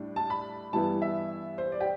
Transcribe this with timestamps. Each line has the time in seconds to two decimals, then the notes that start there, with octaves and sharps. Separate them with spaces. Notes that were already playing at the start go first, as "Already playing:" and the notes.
Already playing: A2 G3 D4
0.16 A5
0.30 B5
0.73 G2 E3 G3 B3 E4 A5
1.02 E5
1.58 C5
1.72 D5
1.81 G4